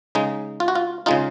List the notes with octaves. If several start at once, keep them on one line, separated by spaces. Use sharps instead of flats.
C#3 G#3 D#4
F4
F#4
F4
C#3 G#3 D#4 F4